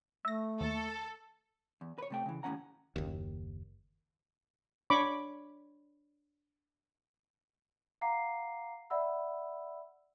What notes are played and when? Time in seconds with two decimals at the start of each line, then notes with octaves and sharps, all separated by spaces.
0.25 A3 E5 A#6
0.61 D#2 A4
1.81 E2
1.98 B4 C#5
2.10 C3 A3 G5
2.26 C#3 E3
2.43 D#2 A2 C#3 C#4 F#5 A#5
2.96 F#1 D#2
4.90 D4 C#5 B5 C#6 D6
8.01 F5 F#5 A#5 D6 C7
8.90 D5 E5 F#5 B5 E6